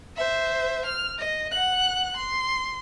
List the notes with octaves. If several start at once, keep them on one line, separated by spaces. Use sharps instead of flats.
C5 E5
F6
D#5
F#5 F#6
C6